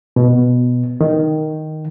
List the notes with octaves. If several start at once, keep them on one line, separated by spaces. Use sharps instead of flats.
B2
D#3